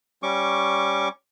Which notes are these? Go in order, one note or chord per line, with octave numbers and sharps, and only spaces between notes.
G3 C#4 C#6 D6